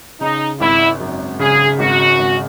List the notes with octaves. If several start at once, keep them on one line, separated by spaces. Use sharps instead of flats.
C#3 D#4
G#1 E4
F#2
C#3 G#4
G#1 F#4
G#1